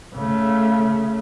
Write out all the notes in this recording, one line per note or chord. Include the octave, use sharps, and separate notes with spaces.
C#3 A3